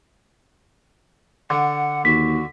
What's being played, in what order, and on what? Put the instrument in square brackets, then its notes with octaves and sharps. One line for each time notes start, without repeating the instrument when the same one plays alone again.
[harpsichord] D3 [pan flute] F#5
[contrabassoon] D#2 [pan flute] F#4 [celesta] B6